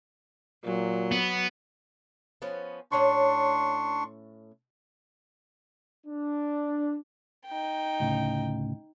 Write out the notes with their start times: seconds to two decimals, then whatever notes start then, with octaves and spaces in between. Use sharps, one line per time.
0.64 A#2 F#3
1.12 B3
2.42 F3 B3 C#4
2.92 A2 C#4 D4 G5 C6 C#6
6.07 D4
7.47 D#4 G5
8.00 D2 A2 C#3